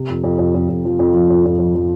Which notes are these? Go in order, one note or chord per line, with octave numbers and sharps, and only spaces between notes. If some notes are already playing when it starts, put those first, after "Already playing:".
Already playing: C3
F2
F2
F2
F2
F2
F3
F2
F3
F2
F2
F3
F3